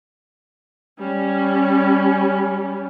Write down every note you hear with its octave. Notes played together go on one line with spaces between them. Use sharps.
G3 C#4